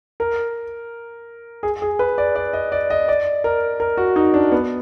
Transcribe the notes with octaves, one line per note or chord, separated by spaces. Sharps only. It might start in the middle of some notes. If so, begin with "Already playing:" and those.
A#4
G#4
G#4
B4
D5
D5
D#5
D5
D#5
D5
A#4
A#4
F#4
D#4
D4
B3